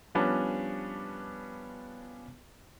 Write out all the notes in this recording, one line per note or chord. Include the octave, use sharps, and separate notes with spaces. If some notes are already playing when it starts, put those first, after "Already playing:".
F3 G3 B3 C#4 D4